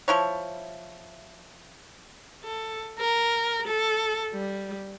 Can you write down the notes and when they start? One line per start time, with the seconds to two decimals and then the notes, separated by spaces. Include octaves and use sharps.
0.08 F3 E4 C#5
2.44 A4
3.00 A#4
3.67 A4
4.33 G3